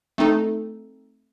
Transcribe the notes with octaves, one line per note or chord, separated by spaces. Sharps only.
A3 C4 D#4 A4